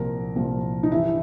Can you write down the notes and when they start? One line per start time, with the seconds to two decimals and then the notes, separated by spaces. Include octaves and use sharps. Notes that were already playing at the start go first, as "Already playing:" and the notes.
Already playing: C2 A#2 F3 A#4
0.36 C2 A#2 F3
0.83 D#4
0.91 G2 E3 E4